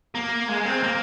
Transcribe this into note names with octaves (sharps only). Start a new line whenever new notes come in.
A#3
G#3
C4
A#3